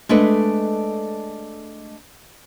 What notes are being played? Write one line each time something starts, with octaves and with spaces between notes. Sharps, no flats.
G#3 A3 D4 A4 B4 D#5